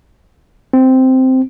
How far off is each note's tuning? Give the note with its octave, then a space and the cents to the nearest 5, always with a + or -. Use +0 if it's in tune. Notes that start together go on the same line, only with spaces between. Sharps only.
C4 -5